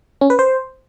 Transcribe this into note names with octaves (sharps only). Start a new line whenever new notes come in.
C#4
B4
C5